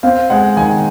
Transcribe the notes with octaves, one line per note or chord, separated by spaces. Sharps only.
C4 F5
G#3 F#5
D#3 G#5